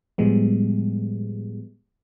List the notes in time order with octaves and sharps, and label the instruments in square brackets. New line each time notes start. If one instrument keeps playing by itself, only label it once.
[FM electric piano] A2 F3 G3 G#3 B3